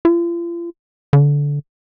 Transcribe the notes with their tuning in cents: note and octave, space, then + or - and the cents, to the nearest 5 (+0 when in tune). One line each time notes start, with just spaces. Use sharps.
F4 -40
D3 -20